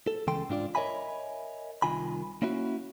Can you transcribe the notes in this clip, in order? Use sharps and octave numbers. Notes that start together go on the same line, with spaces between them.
A4
C#2 C#3 E3 A4 G5 C6
G#2 D4 F4 D5
A#4 C#5 D#5 E5 G#5 B5
C2 G2 D#3 F4 G#5 B5
A#3 C#4 E4 F#4